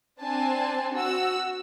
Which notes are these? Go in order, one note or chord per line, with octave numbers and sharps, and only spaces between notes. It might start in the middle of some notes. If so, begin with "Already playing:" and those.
C4 D4 G#5 A5
F#4 E6